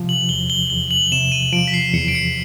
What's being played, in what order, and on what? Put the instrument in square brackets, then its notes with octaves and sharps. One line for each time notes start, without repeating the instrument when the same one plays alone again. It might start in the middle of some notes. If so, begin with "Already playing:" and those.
Already playing: [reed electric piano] C3 F3
[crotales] F#7
[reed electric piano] E2 [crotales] G7
[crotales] G7
[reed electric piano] E2 [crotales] G7
[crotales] F#7
[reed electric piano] C3 [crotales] E7
[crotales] D#7
[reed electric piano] F3 [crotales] D7
[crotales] B6
C7
[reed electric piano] E2 [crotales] C#7
[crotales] D7
C#7